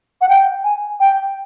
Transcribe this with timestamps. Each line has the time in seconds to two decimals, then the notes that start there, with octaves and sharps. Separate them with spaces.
0.21 F#5
0.29 G5
0.64 G#5
1.00 G5